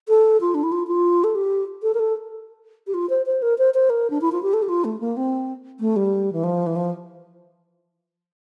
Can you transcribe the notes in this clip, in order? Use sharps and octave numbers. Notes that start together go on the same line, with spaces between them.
A4
F4
D4
E4
F4
F4
A4
G4
A4
A#4
A4
G4
F4
C5
C5
A#4
C5
C5
A#4
D4
E4
F4
G4
A4
G4
F4
A3
A#3
C4
A3
G3
E3
F3
E3
F3